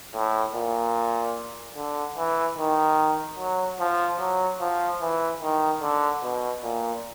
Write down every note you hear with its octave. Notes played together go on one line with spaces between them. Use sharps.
A2
A#2
D3
E3
D#3
F#3
F3
F#3
F3
E3
D#3
D3
B2
A#2